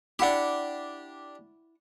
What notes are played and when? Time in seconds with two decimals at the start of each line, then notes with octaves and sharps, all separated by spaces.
0.19 D4 E4 G4 F#5